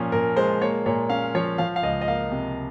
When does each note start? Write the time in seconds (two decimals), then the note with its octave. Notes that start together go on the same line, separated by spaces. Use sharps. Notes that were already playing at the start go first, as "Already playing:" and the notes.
Already playing: A#2 F3 C#4
0.12 A#2 A#4
0.36 G#3 C5
0.62 A#3 C#5
0.86 A#2 C#5
1.09 C#4 F5
1.35 F3 C#5
1.58 F3 F5
1.76 F5
1.83 C#2 D#5
2.01 D#5
2.08 A#3 F5
2.32 C3